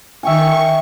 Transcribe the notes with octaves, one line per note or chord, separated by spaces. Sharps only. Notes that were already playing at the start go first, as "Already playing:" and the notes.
D#3 E5 G5 G#5 C#6